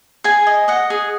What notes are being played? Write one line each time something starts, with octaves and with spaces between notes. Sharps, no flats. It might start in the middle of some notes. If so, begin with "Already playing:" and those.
G#4 G#5
D#5
D#5 F#5
G#4